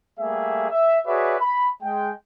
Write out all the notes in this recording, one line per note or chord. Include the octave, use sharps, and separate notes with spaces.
G3 A3 A#3 G#4 E5
E5
F#4 G#4 B4 C#5 D5 E5
B5
G#3 G5